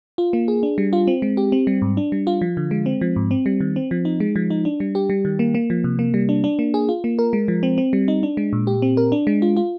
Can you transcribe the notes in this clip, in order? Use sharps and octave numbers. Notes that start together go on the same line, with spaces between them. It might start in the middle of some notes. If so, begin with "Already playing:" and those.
F4
A#3
G#4
D4
G3
F4
C4
G#3
G4
C4
G3
G#2
D4
G3
F4
F3
D3
G#3
C4
F3
G#2
C4
G3
D#3
C4
F3
D#4
G#3
F3
D#4
D4
G3
G4
G3
D#3
A#3
A#3
F3
C3
A#3
G3
D4
D4
A#3
G#4
F4
A#3
A#4
G#3
F3
C4
C4
G3
D#4
D4
G#3
A#2
G4
C4
A#4
D4
G#3
F4
F4